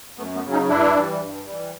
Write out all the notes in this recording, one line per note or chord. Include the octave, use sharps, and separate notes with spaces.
F#2 A3 B3
A3 B3
C#3 F#3
C#4 D#4
G2 D4 E4
E3 G3
G2
E3 G3